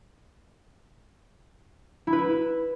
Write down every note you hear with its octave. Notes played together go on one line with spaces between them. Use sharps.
E4
B4
E4